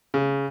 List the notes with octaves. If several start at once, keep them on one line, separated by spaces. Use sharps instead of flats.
C#3